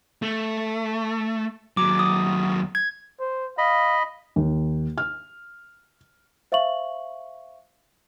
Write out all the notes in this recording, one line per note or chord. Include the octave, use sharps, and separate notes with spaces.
A3
D#2 F#3 D6
D#6
G#6
C5
D#5 F5 B5
D#2
F6
C5 E5 F5 C#6 F#7